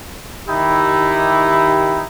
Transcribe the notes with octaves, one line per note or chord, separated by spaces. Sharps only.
D#3 D#4 E4 G4